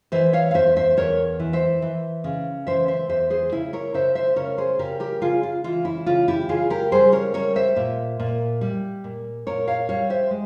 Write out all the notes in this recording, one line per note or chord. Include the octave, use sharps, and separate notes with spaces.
E3 C5 E5
C#5 F5
F5
E2 C5 E5
C5 E5
E2 A#4 C#5
E3
C5 E5
E3
C#3
E3 C5 E5
C5 E5
E2 C5 E5
G#4 C5
C#3 E4
A#4 C#5
C#3 C5 E5
C5 E5
C#3 A#4 C#5
G#4 C5
C#3 G4 A#4
G4 A#4
C#3 F4 G#4
F4
E3 F4
E4
C#3 F4
E4 G4
C#3 F4 G#4
G4 A#4
G3 G#4 C5
A#4 C#5
G3 A#4 C#5
C5 E5
A#2
A#2
G3
A#2
A#2 A#4 C#5
C#5 F5
G3 C#5 F5
C5 E5
G#3